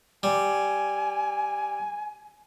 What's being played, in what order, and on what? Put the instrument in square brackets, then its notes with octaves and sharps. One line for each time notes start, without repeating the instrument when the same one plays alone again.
[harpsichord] G3 [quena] G#5